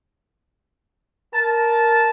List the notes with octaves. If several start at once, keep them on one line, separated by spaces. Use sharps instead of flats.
A#4 A5